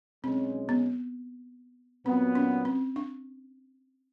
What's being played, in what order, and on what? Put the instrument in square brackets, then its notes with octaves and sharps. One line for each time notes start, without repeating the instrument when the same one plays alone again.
[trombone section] B1 B2 G#3 C#4 [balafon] C4
[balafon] B3
[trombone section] A#2 F#3 B3 [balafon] C4
[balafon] C#4
C4
D4